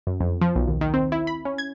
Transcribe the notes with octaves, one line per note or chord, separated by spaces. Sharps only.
F#2
F2
F3
B1
D#2
D#3
C4
E4
B5
C#4
G#6